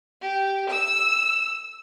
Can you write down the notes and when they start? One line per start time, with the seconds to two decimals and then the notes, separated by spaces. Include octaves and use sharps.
0.22 G4
0.70 E6